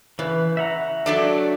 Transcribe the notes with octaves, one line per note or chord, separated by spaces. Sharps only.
C#3 E3 B4
E5 F#5 A#5
F#3 A3 D4